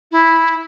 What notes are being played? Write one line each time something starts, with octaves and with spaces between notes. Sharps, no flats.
E4